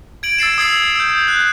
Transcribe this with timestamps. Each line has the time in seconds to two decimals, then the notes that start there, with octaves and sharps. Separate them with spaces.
0.23 G#6 D7 F#7
0.38 E6 A6 C7 E7
0.58 D#6 E6 G#6 C7 F#7
0.96 E6 G6
1.28 F#6